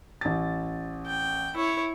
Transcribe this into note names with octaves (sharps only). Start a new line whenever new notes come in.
A1 A6
G5
E4 C#5